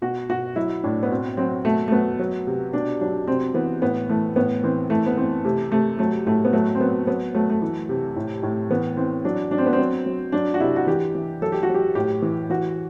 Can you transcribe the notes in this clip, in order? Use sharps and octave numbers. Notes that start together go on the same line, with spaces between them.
B2 F#4
B2 F#4
F#3 E4
A2 D4
B3
B2 C4
F#3 C4
B2 A3
A3
F#3 B3
F#3
C3
B2 D4
F#3 D4
C3 C4
E3 B3
A2 B3
E3 A3
A2 B3
E3 C4
E3 A3
B3
E3 C4
C3 A3
C3 A3
F#3 A3
A2 A3
B3
F#3 A3
C4
F#3 B3
F#3 B3
F#3 A3
A3
E3
C3
A2
A2
E3 B3
E3 C4
F#3 D4
F#3 D4
C4
B3
C4
F#3
F#3
F#3 D4
F#4
C3 E4
F#4
E3 G4
E3
F#3 A4
G4
F#4
F#3
G4
A2 G4
E3
E3 F#4